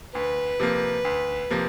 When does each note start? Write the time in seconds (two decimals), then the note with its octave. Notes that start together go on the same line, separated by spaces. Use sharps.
0.14 D2 B4
0.60 C3 F3 A#3
1.05 D2
1.50 C3 F3 A#3